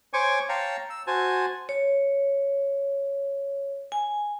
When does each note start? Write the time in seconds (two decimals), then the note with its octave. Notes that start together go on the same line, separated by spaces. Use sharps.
0.13 C5 C#5 G#5 C#6 D6
0.49 C#5 F5 G5 A5 A#5
0.90 E6
1.07 F#4 C5 G#5 A5
1.69 C#5
3.92 G#5